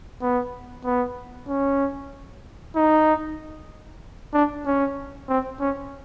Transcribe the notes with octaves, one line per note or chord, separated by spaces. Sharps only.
B3
B3
C#4
D#4
D4
C#4
C4
C#4